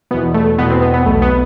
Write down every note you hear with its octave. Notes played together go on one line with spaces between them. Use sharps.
E2 B2 B3
A3
E2 B2 B3
C4
B3
B3
B1 B2 A3
B3